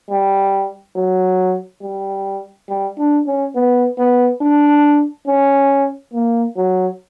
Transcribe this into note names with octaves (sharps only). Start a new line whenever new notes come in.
G3
F#3
G3
G3
D4
C#4
B3
B3
D4
C#4
A#3
F#3